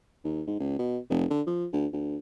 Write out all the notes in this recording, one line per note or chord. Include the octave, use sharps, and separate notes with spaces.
D#2
G#2
C#2
B2
F1
D3
F3
D2
D2